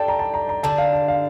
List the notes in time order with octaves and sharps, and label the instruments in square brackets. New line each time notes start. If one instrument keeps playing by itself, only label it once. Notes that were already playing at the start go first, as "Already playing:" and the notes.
Already playing: [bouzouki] G3 D4 A4 [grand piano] D5 G5 A5
[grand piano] A#5
A5
A#5
A#5
[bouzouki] D3 G3 D4 [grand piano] A5
[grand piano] F5
A5
F5